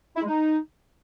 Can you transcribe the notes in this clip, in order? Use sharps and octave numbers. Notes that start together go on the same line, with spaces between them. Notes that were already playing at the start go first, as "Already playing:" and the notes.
E4
G#3
D#4